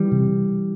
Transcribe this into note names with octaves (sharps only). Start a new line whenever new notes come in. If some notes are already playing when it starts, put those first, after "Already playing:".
Already playing: E3 G3
C3